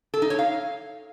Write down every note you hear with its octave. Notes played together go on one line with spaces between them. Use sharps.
A4
D#4
C#5
F5